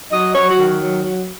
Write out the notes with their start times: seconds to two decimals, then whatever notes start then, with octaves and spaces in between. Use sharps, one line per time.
0.11 F#3 D#5
0.34 F#3 C#5
0.50 F#4
0.57 D#3
0.81 F#3
1.04 F#3